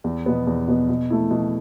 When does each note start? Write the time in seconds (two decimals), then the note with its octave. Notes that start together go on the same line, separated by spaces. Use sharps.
0.04 E2
0.26 B2 B3
0.47 E2
0.68 B2 B3
0.89 B2
1.10 A3 E4
1.31 B2